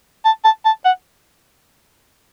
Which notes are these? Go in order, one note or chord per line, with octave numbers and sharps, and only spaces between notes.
A5
A5
A5
F#5